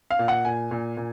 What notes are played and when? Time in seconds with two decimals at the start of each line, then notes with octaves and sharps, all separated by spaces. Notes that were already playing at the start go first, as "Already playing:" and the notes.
0.11 F5
0.19 A#2
0.28 F#5
0.45 A#2 G#5
0.71 A#2
0.97 A#2